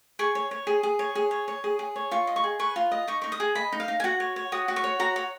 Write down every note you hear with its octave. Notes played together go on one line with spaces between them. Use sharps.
G#4 C#6
C#5
C#5
G#4
G#4
C#5
G#4
C#5
C#5
G#4
G#4
C#5
F4 C#6
D#5
C#6
G#4
B4 C#6
F4
D#5
D#4 C#6
D#4 C#6
D#6
G#4
D#5 B5
D#4
F5
D#4
G#5
F#4 F#5
C#5
C#5
F#4 D#6
F#4
C#6
C#5
F#4 A#5
C#5